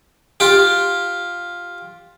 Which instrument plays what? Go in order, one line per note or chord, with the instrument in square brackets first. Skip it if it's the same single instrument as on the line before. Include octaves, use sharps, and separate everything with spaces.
[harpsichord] F4 G4